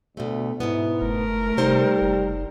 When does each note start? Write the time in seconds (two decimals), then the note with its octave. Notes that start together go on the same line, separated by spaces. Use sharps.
0.17 D2 B2 A3
0.60 G#2 B2 B3 E4
1.01 F#1 A3 A#4
1.57 C3 G3 D#4 C5 F#5
2.01 F#1